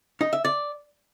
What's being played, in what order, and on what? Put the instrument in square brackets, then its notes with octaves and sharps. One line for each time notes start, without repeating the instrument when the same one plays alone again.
[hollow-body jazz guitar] D#4
E5
D5